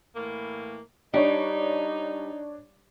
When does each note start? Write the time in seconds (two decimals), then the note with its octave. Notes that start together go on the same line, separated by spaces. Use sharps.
0.16 A2 E3 A#3
1.14 G3 D4 D#4 C#5